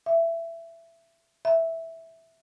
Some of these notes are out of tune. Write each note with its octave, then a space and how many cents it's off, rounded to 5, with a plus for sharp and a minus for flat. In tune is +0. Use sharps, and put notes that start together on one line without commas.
E5 +15
E5 -5